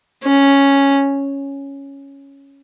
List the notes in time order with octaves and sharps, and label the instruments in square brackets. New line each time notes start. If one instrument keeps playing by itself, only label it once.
[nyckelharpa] C#4